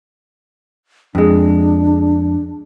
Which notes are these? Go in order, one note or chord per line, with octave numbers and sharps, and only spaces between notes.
F2 G#3 D4